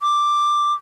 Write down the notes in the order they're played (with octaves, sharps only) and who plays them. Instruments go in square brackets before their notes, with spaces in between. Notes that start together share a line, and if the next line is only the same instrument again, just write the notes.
[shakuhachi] D6